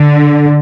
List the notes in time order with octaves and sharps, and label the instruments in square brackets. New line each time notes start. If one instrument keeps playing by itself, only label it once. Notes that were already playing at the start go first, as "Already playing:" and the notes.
Already playing: [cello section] D3